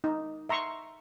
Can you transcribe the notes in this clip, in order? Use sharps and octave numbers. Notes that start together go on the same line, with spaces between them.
D#4
E5 A#5 C6 C#6